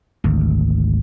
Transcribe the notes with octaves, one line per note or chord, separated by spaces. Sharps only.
G#1 D2